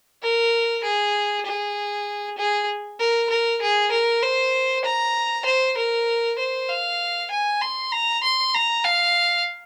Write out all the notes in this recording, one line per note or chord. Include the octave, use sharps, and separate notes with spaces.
A#4
G#4
G#4
G#4
A#4
A#4
G#4
A#4
C5
A#5
C5
A#4
C5
F5
G#5
C6
A#5
C6
A#5
F5